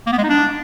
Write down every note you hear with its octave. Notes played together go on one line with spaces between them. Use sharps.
A#3
B3
G#3
D#4
D4